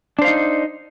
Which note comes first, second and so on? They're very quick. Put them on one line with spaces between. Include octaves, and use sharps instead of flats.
D4 C5 F5 D#4